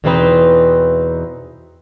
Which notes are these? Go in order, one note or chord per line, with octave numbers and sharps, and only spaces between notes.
E2 B2 E3 C4 D#4 B4